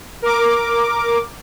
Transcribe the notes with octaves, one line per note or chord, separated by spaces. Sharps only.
A#4 D6